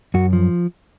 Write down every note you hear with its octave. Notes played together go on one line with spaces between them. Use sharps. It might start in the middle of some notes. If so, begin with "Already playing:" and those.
F#2 F#4
F3